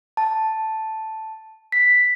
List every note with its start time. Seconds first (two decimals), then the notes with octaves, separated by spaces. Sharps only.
0.17 A5
1.72 B6